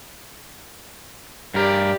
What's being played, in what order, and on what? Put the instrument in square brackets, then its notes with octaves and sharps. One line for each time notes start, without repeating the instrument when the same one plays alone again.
[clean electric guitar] G2 A#4 [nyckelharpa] G4 D5